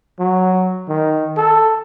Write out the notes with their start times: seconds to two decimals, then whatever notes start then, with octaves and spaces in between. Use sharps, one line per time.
0.19 F#3
0.89 D#3
1.37 A4